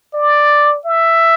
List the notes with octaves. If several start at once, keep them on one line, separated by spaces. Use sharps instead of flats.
D5
E5